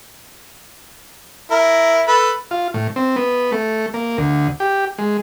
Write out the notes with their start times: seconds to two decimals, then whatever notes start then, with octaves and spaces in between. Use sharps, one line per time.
1.51 E4 A#4
2.07 A4 B4 B5
2.51 F4
2.74 A2
2.96 C4
3.16 B3
3.52 A3
3.94 A#3
4.18 D2
4.60 G4
4.98 G#3